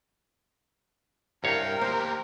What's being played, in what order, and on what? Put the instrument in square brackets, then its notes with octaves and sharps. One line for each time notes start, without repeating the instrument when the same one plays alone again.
[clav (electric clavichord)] C2 C#5 F5 [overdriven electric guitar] G2 G5 [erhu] A#4
[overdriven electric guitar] A#3 G4 [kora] C5